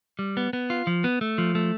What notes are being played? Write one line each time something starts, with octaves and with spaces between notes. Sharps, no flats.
G3
B3
B3
F4
F3
B3
A3
F3
A3